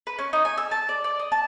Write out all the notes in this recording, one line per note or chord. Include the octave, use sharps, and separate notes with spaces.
B4
C#4
D#4
G#5
E6
A5
D5
D5
D#5
A5